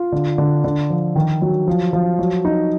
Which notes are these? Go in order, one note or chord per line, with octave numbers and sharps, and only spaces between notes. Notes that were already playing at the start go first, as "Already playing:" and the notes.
Already playing: F4
D3
D3
D3
F3
D#3
F#3
F3
F3
F#3
D#4